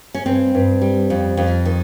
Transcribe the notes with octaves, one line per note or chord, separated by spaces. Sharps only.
C#4
G2 C4
G2
G3
F2
F2
D#3